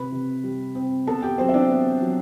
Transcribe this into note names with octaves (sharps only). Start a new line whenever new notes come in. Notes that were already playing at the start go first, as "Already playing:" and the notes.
Already playing: C3 B4 B5
C3
G3
C4
B3 A4 A5
G4 G5
F#3 C4 C5
E5
D4 D5
B3
F#3